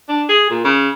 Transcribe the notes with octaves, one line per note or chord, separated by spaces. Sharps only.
D4
G#4
A#2
C#3